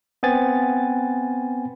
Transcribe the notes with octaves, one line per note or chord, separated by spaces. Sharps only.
B3 C4 G#5 A6